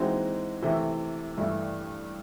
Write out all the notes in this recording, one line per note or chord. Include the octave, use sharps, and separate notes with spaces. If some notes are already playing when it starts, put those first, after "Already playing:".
Already playing: E3 G#3 C4 D#4 F#4
C3 E3 A3
G2 E3 A3